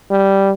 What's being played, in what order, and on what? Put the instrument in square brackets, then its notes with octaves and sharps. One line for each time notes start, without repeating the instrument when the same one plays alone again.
[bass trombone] G3